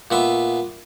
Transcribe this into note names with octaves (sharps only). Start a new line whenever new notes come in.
A#2 B3 E5